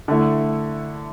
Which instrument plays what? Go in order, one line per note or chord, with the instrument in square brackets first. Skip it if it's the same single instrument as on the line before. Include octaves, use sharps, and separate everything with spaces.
[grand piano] D3 A3 E4